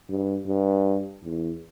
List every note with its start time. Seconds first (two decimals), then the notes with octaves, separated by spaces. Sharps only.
0.09 G2
0.47 G2
1.24 E2